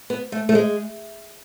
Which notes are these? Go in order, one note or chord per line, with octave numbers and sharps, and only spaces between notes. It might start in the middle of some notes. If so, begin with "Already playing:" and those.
B3
A3
A3
G#3